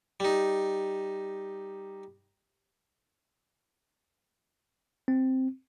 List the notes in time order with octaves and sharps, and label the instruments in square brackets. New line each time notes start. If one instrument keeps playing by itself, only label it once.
[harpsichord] G3 D#4
[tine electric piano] C4